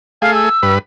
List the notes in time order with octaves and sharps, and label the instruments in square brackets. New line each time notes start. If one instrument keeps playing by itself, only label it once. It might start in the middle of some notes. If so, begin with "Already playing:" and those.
[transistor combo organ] A3 G#4 [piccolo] F5
[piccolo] E6
[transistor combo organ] G2 B4